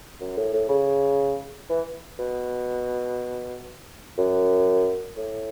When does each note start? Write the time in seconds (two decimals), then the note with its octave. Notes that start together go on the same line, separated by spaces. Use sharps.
0.20 F#2
0.37 A2
0.54 A2
0.69 C#3
1.69 E3
2.19 B2
4.18 F#2
5.17 A2